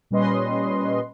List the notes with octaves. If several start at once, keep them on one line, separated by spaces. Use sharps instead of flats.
A#2 G3 C#4 B4 D#5 C6